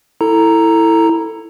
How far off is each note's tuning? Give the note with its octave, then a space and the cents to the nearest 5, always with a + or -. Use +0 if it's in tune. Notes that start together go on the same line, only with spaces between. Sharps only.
E4 +0 A4 +15 A#5 +0